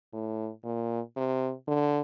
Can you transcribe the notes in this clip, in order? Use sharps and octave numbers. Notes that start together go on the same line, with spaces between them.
A2
A#2
C3
D3